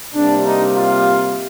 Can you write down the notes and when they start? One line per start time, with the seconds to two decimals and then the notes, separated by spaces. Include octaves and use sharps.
0.14 C3 G3 A#3 D4
0.46 D#4
0.76 F4